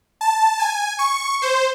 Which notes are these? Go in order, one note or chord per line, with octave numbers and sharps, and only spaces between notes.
A5
G#5
C#6
C5